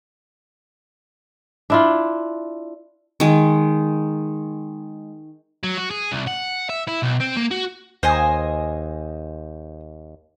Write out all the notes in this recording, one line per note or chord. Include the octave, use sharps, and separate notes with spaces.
D4 E4 F4
D#3 G#3
F#3
F#4
G#4
C2
F#5
E5
E4
B1
C4
A#3
F#4
D#2 C5 D#5 G#5